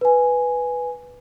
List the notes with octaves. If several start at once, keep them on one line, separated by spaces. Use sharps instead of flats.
B4 G#5